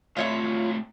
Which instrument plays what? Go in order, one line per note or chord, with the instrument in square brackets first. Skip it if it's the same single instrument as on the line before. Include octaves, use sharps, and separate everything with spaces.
[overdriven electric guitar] A2 C3 [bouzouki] F4 C#5 E5